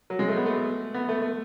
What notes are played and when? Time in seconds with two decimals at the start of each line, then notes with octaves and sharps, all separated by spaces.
0.10 F#3
0.19 G#3
0.28 A3
0.37 B3
0.46 A3
0.94 B3
1.09 A3
1.22 A3